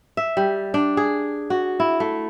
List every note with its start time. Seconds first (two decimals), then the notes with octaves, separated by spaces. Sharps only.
0.17 E5
0.37 G3
0.74 D4
0.97 G#4
1.50 F#4
1.80 E4
2.00 A3